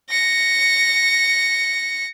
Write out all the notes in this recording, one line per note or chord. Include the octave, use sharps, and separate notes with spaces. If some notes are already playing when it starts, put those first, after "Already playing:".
A#6 C#7